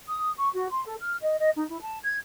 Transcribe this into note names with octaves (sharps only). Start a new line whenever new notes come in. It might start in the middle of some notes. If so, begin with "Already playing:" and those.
D#6
C#6
F#4
C6
A4
F6
D#5
D#5
D#4
E4
A5
G#6